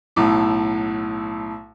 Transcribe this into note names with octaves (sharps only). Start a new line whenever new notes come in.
B1 A2